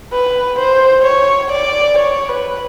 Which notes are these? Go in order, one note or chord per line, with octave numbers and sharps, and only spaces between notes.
B4
C5
C#5
D5
C#5
B4